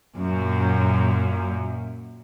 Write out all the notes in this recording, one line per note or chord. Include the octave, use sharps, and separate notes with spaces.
F#2 A#2